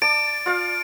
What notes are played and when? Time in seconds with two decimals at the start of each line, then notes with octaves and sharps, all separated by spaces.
0.02 D5 A5 D6 D7
0.46 F4 D5 F5